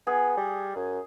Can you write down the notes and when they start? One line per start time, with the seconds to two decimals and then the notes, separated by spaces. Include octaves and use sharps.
0.07 B3 G#4
0.37 G3
0.76 F#2